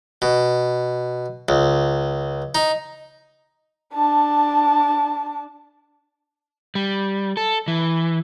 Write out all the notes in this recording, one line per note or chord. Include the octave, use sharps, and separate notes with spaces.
B2
C#2
D#4
D4 A5
G3
A4
E3